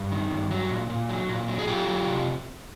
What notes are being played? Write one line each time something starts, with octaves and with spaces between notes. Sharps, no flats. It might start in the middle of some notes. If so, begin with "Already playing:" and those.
Already playing: G2
D#3
G2
F#3
A#2
A#2
F#3
A#2
F#3
G#4
F#3 F4 G4
F#3
C3